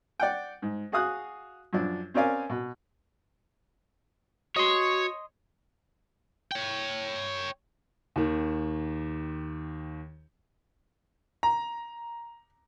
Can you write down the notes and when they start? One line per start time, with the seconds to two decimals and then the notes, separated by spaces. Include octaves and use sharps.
0.20 D5 F#5 G5
0.62 G#2
0.92 F#4 G#4 F5 D#6 F#6
1.73 F#2 F3 D4
2.14 C4 C#4 A#4 D5 F5 G#5
2.50 B2
4.56 F#4 C#5 D#5 C6
6.52 C#5 G5
8.16 D#2 D#3
11.43 A#5